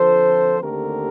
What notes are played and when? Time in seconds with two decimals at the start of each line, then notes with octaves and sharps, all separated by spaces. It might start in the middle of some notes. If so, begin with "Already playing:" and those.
Already playing: F2 D3 F3 A4 C5
0.60 D#2 D3 A3 C4 G4 A#4